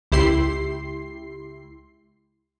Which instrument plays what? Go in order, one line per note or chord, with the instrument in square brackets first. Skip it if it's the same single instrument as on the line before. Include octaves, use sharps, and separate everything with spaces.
[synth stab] C#2 E4 G4 C6 C7